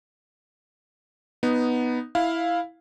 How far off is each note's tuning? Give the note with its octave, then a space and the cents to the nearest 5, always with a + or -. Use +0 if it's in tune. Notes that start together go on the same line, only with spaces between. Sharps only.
B3 +0 D#4 +0
E4 +0 F5 +0